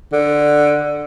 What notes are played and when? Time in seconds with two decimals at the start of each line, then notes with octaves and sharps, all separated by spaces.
0.13 D3